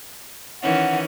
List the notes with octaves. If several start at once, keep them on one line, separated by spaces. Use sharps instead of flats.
D#3 E3 C#4 F#5